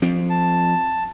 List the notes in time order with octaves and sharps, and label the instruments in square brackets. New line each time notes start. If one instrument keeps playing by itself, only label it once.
[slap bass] F3 C4
[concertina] A5